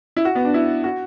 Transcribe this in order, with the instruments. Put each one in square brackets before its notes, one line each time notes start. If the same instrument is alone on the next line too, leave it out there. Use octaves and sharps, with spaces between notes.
[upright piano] E4
F#4
B3
D4
E4
F#4